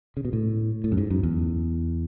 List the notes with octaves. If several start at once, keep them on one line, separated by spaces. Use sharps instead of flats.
C#3
B2
A2
A2
F#2
G#2
F#2
E2